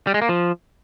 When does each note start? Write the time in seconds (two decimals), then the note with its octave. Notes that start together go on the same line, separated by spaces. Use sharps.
0.07 G3
0.14 G#3
0.22 A#3
0.29 F3